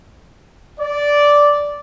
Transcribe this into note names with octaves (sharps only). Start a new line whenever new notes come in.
D5